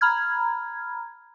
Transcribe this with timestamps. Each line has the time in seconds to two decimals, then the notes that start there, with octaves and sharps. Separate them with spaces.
0.01 A#5 B5 F6 G#6